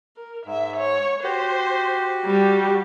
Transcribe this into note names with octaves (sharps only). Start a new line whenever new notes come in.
A#4
G#2 E5
C#5
F#4 G4 C5
G3